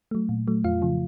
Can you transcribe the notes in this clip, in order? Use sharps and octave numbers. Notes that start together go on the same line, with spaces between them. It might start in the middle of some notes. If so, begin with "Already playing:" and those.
F#3 A3
A#2
F#3 A3
F2 F4 F5
C#3 F3